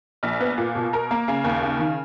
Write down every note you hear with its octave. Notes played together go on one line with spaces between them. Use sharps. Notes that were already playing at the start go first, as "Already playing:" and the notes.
A#1
B3
A#2
B2
A#4
A#3
C#3
D#2
C#3
D#3